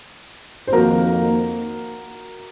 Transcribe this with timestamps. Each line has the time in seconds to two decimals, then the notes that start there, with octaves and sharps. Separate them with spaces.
0.67 C5
0.72 F2 D#3 A#3 F#4 A#4